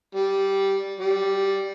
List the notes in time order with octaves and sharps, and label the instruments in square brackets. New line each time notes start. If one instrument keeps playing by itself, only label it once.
[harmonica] G3
G3